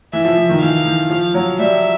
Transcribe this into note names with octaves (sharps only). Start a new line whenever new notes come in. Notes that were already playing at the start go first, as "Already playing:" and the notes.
E3 E5
F3
E3
D#3
E3 F5
E3
F3
F#3
G3 E5